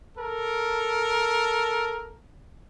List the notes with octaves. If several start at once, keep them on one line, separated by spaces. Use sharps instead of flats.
A4 A#4